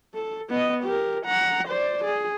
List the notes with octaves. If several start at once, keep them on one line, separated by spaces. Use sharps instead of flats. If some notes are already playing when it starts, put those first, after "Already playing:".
A4
B3 D#5
G4 A#4
F#5 A#5
C5 D5
G#4